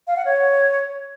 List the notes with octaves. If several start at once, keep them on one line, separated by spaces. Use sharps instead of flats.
F5
F#5
C#5